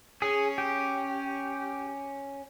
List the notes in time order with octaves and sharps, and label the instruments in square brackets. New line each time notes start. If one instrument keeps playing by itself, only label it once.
[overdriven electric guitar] C#4 [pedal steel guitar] G#4
[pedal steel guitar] G4